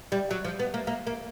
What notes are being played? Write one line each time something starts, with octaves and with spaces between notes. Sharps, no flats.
G3
F#3
F3
B3
A#3
A#3
A#3